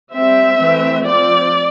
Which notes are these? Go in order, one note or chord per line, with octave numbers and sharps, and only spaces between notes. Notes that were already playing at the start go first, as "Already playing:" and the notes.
G3 C4 E5
E3 A3 C4
F3 C4 D5